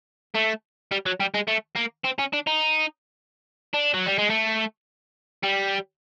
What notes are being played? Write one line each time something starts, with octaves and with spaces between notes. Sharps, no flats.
A3
G3
F#3
G3
G#3
A3
A#3
C4
C#4
D4
D#4
D4
F#3
G3
G#3
A3
G3